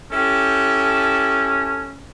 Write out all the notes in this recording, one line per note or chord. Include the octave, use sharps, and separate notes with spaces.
C#4 E4 G4 A4